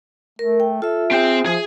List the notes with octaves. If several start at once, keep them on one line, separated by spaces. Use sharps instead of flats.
A3 A#4
G5
F4 A4 E5
C4 G#4 G5
F3 G#4